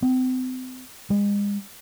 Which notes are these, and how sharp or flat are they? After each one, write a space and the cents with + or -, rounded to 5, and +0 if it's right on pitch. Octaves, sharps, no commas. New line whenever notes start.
C4 -35
G#3 -40